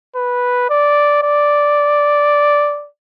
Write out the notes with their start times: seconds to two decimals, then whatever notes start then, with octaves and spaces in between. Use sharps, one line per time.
0.16 B4
0.70 D5
1.23 D5